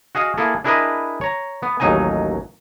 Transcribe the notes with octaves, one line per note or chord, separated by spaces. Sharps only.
F#4 G#4 D#5 F5
A#3 E4 G#4 A4
D4 E4 G#4 A#4 B4 D#5
C#5 A#5
B3
A1 D#2 F#3 D#4 D#5 G#5